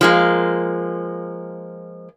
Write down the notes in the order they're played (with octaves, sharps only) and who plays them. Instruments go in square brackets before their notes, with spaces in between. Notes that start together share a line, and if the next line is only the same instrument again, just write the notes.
[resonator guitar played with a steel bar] F3 G#3 A#3